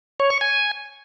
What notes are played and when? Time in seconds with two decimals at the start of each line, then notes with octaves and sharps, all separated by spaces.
0.20 C#5
0.30 C#6
0.41 G#5